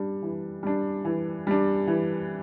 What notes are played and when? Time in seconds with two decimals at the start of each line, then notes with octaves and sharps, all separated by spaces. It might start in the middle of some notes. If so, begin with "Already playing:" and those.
Already playing: G3 D4
0.23 E3
0.63 G3 D4
1.05 E3
1.47 G3 D4
1.87 E3